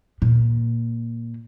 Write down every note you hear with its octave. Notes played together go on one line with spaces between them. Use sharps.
A#2